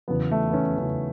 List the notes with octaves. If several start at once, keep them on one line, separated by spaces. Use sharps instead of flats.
E2 C#3 F#3 B3
A3
B3
C#4
E2 C#3 F#3 C#4